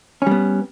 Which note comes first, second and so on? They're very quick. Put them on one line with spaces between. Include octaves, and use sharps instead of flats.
C#4 G3 B3